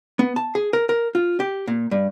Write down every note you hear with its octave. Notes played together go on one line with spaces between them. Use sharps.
B3
A5
G#4
A#4
A#4
F4
G4
A#2
G2